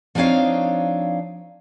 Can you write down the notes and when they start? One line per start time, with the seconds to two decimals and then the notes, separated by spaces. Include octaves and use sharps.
0.15 F3 C4 D4 D#4 C#5 F5